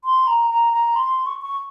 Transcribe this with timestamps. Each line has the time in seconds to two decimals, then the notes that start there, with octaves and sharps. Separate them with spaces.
0.04 C6
0.27 A#5
0.50 A#5
0.73 A#5
0.96 C6
1.26 C#6
1.42 C#6